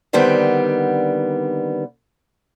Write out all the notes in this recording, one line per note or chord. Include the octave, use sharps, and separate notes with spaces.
D3 D#3 G3 B3 C4